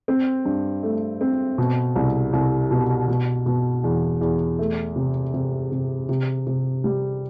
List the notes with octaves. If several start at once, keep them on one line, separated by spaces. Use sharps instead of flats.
C4
G2
A3
C4
B2
C2
C2
B2
B2
B2
E2
E2
A3
C3
C3
C3
C3
C3
G3